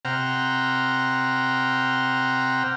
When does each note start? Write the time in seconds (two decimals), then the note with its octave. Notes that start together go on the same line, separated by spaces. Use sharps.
0.05 C3 C5 F#5 G5 A#5 F6